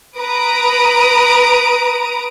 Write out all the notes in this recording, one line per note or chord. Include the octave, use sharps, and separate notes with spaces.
B4 A#5 D#6 D7